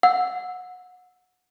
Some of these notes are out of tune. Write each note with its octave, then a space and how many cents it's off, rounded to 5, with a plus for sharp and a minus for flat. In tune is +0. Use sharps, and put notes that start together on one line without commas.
F#5 -25 E6 +0